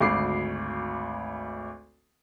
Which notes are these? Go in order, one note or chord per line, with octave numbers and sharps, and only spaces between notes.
G#1 D2 D6 C7